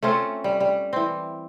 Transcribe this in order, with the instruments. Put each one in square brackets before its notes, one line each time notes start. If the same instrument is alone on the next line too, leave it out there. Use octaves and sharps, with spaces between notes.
[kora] A3 C4 C#4 F4
G3
G3
E3 C4